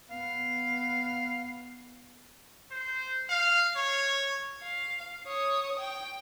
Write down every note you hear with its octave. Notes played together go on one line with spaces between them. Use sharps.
B3 F5
C5
F5
C#5
F5
C#5 D#6
G5